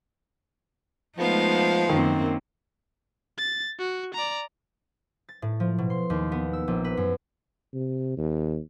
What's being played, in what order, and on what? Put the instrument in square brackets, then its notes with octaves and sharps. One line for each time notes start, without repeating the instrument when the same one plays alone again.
[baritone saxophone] F3 [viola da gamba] G#3 A3 D#4 [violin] B3 F5
[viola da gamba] F#2 A#3 C4 [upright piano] D#3
[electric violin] A6
F#4
D5 A#5
[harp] A6
A2
F3
B2
C6
D#2
B3
E6
A#1
B4
F#2
[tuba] C3
D#2